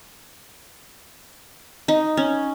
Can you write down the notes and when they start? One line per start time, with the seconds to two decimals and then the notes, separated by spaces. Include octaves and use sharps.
1.88 D#4
2.17 C#4